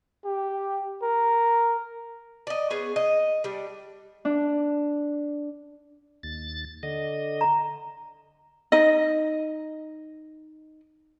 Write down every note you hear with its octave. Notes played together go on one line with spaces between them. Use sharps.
G4
A#4
D5 D#5
B3 C#4 G#4
D#5
G3 D4
D4
D#2 A6
D3 D#5
A#5
D#4 D#5